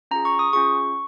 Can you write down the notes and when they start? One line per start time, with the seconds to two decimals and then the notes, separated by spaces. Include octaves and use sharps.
0.11 C#4 F4 G#4 A#5
0.25 C#6
0.39 D#6
0.53 C#4 F4 G#4 C#6